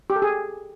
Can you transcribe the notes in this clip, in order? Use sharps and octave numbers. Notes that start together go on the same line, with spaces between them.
G4
A4
G#4